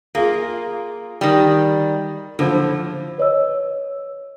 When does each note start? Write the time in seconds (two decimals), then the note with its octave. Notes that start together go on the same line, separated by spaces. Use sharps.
0.15 A#3 F4 G#4
1.21 D#3 G3
2.39 A2 D3 F3
3.18 B4 C#5 D#5 E6